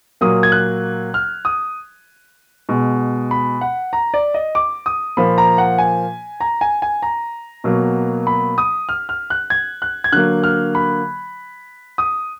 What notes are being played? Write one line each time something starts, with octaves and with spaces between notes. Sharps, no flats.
A#2 F#3 A#3 D#6
G#6
F#6
F6
D#6
B2 G#3
B5
F#5
A#5
D5
D#5
D6
D#6
A#2 F3 A#3 B5
A#5
F#5
G#5
A#5
G#5
G#5
A#5
B2 F#3 A#3
B5
D#6
F6
F6
F#6
G#6
F#6
G#6
D3 F#3 A#3 F#6
F6
B5
D#6